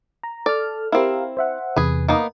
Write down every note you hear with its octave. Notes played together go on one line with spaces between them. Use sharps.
A#5
A4 D5 F6
C4 E4 G4 A#4 F5
C5 E5 F#5
E2 C3 G#4 B4
A#3 B3 D#4